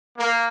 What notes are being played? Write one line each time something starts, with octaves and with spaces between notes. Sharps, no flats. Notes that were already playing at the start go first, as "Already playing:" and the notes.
A#3